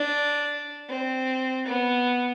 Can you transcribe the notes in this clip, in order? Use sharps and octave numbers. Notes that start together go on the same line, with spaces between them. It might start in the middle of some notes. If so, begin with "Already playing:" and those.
Already playing: D4
C4
B3